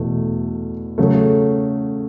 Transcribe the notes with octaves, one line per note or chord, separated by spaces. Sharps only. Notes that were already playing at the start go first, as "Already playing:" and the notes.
Already playing: E2 B2 A3
C#3 F#3 A3